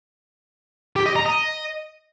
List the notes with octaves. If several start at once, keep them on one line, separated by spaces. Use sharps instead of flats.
G4
D#5
A#5
D#5